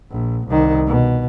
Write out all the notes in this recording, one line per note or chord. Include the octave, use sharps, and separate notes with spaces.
A#1
C2 D#3
B2